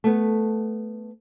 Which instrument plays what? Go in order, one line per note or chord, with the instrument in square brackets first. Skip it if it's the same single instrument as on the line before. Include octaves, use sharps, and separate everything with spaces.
[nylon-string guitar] A3 B3